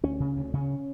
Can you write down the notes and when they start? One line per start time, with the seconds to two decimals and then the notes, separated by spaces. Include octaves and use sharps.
0.03 D2 C#4
0.20 C#3
0.36 D2
0.53 C#3 C#4